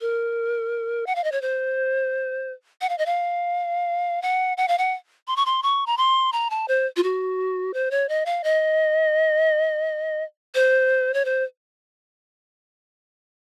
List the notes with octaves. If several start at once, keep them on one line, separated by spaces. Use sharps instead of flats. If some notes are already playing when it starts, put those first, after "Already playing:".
A#4
F#5
F5
D#5
C#5
C5
F#5
F5
D#5
F5
F#5
F#5
F5
F#5
C6
C#6
C6
C#6
A#5
C6
A#5
A5
C5
F4
F#4
C5
C#5
D#5
F5
D#5
C5
C#5
C5